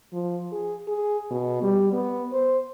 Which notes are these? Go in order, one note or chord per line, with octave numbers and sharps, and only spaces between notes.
F3
G#4
G#4
B2
G3
B3
C5